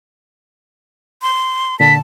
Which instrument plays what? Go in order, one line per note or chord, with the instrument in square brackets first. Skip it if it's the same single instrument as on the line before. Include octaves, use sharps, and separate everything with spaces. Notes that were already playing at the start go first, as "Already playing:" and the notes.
[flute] C6
[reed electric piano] A#2 D3 [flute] A5 [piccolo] B6